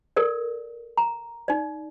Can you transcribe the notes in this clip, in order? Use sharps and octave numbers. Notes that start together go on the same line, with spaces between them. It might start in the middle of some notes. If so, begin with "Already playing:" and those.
A4 A#4 D5
A#5
D#4 D5